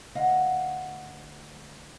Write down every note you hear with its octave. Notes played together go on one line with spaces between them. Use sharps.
D2 D#5 F5 F#5